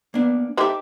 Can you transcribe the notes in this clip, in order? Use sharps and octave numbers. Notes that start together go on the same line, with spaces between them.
A#3 B3 D4
D#4 G4 A4 C5 E5 D6